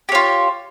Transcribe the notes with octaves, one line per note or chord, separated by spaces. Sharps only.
F4 G4 C#5